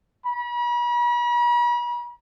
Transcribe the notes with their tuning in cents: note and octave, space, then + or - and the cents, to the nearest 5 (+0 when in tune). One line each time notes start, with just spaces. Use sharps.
B5 -45